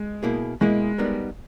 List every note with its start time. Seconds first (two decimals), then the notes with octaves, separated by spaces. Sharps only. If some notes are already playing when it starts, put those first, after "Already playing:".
Already playing: G#3
0.23 B2 A#3 E4 G#4
0.61 B2 G#3 A#3 E4 G#4
0.98 G3 B3 D#4 A#4